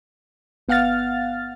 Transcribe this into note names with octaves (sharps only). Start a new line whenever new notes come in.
G1 B3 F5 F#5 F6 A6